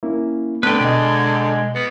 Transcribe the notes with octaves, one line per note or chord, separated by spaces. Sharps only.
A#3 C#4 E4
D3 A3 B3 C4 B4 G5
B2 G#3 D#5
B3